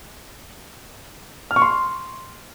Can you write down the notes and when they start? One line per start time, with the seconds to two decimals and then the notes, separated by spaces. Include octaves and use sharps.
1.51 F6
1.56 C#6
1.62 C6